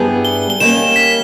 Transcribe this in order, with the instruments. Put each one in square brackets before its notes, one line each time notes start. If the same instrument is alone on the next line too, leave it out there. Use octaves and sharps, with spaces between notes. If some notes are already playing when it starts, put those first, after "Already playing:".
Already playing: [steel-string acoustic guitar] G2 G3 B3 E4 G#4
[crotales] G7
G7
[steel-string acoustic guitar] D#3 G3 A#3 C#4 [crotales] E7
[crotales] B6